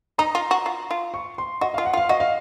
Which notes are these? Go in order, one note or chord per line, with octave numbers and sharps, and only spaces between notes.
D#4 A#5
F4
F#4
F4
F4
C#6
C6
F#4 D#5
F5
F4
F#5
F4
F5
F#4 D#5
F5